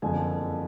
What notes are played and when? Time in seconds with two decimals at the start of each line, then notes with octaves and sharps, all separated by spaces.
0.02 F#1 F2 D3 F3 G#5